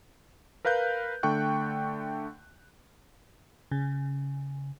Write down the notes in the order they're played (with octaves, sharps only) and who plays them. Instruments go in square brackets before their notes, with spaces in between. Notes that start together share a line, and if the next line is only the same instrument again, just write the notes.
[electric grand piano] A#4 B4 F5 F#6 G6
D3 A3 G5 C#6 F#6
[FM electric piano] C#3